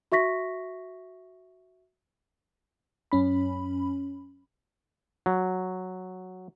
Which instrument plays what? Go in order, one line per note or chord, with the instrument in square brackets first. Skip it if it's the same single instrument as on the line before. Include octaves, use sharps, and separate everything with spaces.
[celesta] F#4 E5 C#6 A#6 B6
[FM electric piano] F#2 C#4 B5
[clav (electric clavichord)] F#3